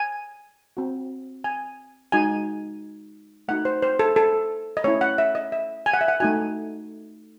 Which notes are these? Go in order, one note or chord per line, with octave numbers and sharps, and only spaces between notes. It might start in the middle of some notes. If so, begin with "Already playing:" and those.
Already playing: G#5
C4 F#4
G#5
G#3 D#4 F#4 G#5
A3 D#4 F#4 F#5
C5
C5
A4
A4
D#5
A3 C#4 E4 C#5
F#5
E5
D#5
E5
G#5
F#5
E5
F#5
A3 D#4 F#4 G#5